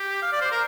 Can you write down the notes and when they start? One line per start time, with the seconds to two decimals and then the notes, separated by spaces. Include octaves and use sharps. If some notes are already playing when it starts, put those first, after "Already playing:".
Already playing: G4
0.22 F5
0.32 D5
0.41 C5
0.51 A#4